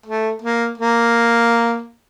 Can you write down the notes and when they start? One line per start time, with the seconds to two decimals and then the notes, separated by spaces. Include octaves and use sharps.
0.06 A3
0.42 A#3
0.78 A#3